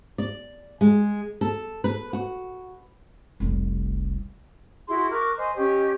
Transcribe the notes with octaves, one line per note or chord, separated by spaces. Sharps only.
D5
G#3
A4
B4
F#4
F1 C2
E4 F#4 G#4 C6
A#4 C#6 D6 F#6
C5 D#5 G#5
C#4 G4 D#5